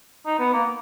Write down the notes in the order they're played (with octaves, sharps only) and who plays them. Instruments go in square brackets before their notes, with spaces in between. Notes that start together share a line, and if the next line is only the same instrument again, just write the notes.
[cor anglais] D#4
B3
A#3